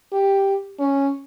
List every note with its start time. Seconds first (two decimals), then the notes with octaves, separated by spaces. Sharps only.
0.12 G4
0.79 C#4